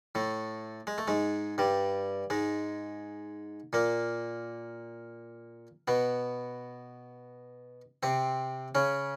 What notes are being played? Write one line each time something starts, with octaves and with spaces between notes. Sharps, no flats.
A2 A3
G#3
A3
G#2 G#3
G2 G3
G#2 G#3
A#2 A#3
B2 B3
C3 C4
C#3 C#4